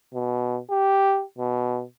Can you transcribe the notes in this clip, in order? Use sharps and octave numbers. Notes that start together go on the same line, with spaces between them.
B2
G4
B2